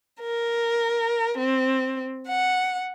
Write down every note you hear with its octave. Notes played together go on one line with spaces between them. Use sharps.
A#4
C4
F#5